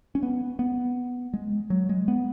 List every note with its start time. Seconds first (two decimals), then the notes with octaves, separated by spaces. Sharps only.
0.15 C#4
0.23 B3
0.59 B3
1.34 G#3
1.70 F#3
1.89 G#3
2.08 B3